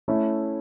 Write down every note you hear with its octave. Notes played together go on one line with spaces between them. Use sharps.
A3 C#4 E4